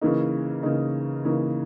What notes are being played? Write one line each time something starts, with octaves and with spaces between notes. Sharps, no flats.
C#3 E3 A#3 D#4
C#3 E3 A#3 D#4
C#3 E3 A#3 D#4